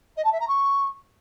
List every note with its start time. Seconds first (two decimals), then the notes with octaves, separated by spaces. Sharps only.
0.16 D#5
0.24 A5
0.32 E5
0.40 A#5
0.48 C#6